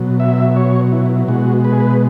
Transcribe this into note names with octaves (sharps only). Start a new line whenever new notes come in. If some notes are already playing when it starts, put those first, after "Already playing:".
Already playing: B2 F#3
E5
C#5
E4
B2 G#3 F#4
B4
G#4
B4